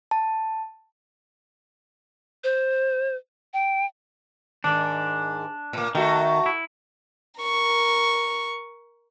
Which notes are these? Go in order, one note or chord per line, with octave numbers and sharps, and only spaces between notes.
A5
C5
G5
G#2 D#3 D4
A2 A#3
D#3 A3 F#4
E4
A#4 C#6